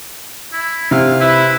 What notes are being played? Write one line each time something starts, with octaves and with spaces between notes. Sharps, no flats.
E4
C3 F5
E4 B4